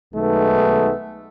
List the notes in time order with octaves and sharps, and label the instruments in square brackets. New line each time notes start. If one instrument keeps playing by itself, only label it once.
[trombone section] B1 D#3 G#3 A3 B3